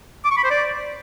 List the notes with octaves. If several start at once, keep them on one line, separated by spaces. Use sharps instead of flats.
D6
C#6
B5
C5
D5